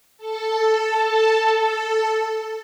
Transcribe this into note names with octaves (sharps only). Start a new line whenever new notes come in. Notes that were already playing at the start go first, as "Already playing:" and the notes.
A4 A5